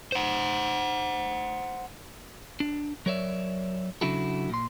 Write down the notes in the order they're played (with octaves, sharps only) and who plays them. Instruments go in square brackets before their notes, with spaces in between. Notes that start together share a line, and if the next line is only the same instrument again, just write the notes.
[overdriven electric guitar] C5 F#5
[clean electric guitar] D4
F#3 A#4 C#5 D5 E5
C#3 F#3 D4 E4 F#4 A4
A#2 C6